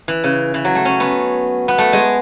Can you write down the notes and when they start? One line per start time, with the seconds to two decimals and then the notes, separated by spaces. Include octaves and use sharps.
0.08 E3
0.24 C#3
0.54 E3
0.65 F#3
0.75 A3
0.85 C#4
1.00 B3
1.68 B3
1.78 A3
1.93 G#3